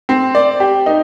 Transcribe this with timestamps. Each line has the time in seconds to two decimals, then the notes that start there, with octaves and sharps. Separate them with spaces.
0.09 C4
0.35 D5
0.60 G4
0.86 D#4